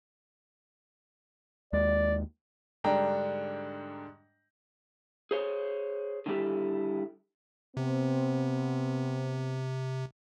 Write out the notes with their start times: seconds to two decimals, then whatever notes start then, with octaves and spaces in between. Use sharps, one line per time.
1.73 D#2 G#3 D5
2.84 G#2 D3 G3 D4 G5 A#5
5.31 G#4 C5 C#5
6.26 D3 D#3 G3 E4 G4 A4
7.77 C3 B3 C4